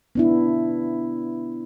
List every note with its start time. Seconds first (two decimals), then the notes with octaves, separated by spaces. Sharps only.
0.15 B3 D4 E4